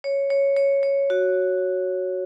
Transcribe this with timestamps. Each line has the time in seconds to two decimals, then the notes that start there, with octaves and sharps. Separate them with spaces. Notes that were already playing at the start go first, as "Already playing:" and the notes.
0.04 C#5
0.30 C#5
0.57 C#5
0.83 C#5
1.10 F#4